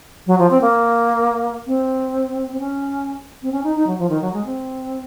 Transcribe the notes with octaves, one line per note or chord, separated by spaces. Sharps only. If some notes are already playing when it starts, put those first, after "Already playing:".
F#3
F3
C4
A#3
C4
C4
C#4
C4
C#4
D#4
D#4
F#3
F3
D#3
F#3
G#3
C4